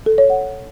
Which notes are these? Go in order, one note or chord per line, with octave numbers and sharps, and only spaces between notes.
A4
C#5
F#5